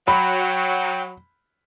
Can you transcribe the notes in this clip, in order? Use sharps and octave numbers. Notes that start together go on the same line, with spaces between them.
F#3 G5 B5